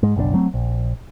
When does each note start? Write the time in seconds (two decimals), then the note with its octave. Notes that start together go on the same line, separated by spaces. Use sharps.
0.03 G#2 G#3
0.16 F#1 B1 C3 D4
0.34 F#3 A3 C4
0.54 A#1